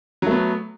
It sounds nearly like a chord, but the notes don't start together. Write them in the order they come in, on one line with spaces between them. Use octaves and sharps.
F#3 A3 B3